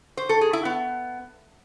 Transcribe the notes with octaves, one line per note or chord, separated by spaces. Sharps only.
C5
A4
G#4
E4
B3